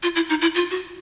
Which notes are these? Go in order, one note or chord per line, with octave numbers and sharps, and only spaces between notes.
F4
E4
D#4
E4
F4
F#4